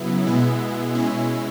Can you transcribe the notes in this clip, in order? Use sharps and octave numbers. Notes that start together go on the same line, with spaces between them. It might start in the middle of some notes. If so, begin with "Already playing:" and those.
Already playing: C#3 F#3 B3 E4
B2 G#3 B3 E4
B2 G#3 C#4 E4